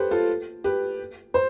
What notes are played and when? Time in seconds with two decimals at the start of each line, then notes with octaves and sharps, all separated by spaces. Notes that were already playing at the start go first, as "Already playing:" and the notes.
Already playing: G4 A4 B4 C5
0.11 F4 A4
0.64 G4 B4
1.34 C5